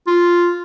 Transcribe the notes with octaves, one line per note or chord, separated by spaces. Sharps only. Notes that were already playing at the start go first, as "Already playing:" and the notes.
F4